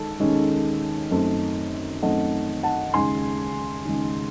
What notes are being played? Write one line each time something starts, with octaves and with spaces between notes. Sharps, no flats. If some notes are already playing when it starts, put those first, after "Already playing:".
Already playing: D#3 G#3 A4
D#2 D#3 G#3 C#4
F#2 D#3 A3 C4
F#2 D#3 A3 C4 D#5 F#5
F#5 A5
D#2 C#3 G#3 G#5 C6
D#2 C#3 G#3